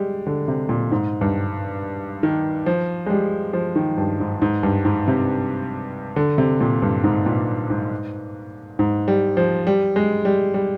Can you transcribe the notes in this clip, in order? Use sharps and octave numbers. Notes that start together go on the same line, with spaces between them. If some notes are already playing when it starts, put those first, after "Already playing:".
Already playing: G3 G#3
D3
C3
A#2
G#2
G2
D#3
F3
G#3
G3
F3
D#3
G2
G#2
G#2
G2
G#2
C3
D3
C3
A#2
G2
G#2
A#2
G#2
G#2
G3
F3
G3
G#3
G3
G3